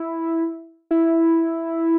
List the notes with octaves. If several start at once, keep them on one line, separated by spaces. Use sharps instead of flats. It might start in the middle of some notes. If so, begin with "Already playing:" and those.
Already playing: E4
E4